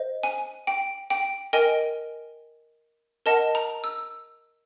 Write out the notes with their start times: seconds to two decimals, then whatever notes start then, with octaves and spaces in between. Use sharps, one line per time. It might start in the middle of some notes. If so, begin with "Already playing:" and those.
Already playing: C5 D#5
0.23 G#5
0.67 G5
1.10 G5
1.53 A#4 D#5 G5 G#5
3.26 A#4 D#5 F#5 A5
3.55 A#5
3.84 E6